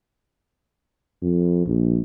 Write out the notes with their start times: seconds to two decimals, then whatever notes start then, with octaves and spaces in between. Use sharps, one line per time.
1.22 F2
1.66 A#1